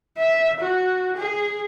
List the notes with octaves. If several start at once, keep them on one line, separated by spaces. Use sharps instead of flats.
E5
F#4
G#4